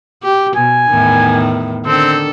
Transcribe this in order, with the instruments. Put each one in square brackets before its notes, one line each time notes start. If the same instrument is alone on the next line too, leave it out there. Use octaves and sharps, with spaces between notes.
[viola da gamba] G4
[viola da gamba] B2 [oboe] G#5
[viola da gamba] E2 A2 D#3
[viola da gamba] D3 D#3 A4 [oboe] C4